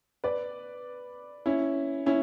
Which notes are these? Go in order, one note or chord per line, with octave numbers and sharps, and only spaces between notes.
B4 D5
C#4 E4
C#4 E4